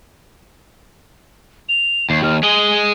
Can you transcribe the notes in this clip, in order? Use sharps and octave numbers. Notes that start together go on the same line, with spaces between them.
F7
D#2 C7
D#2 F6
G#3 G#4 G7